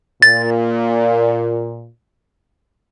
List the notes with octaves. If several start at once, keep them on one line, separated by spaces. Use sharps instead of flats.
A#2 A6